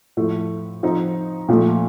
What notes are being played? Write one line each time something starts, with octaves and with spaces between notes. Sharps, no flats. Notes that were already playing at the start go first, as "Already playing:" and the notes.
A2 F3 A3
F3 C4 D#4
A#2 F3 A3